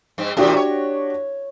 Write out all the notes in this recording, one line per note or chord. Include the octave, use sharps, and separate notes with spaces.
G2 C4
A2 C3 E3 D4 F#4 G4
C#5